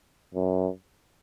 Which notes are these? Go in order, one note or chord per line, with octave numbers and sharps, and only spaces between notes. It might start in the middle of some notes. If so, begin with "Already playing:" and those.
F#2